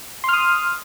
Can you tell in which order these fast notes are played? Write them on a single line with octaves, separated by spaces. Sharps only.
C6 F6 D#6